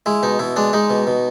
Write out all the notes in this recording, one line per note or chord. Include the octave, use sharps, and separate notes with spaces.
G#3 E4
B2 D#4
B2 E4
G#3 D4
G#3 D#4
B2
B2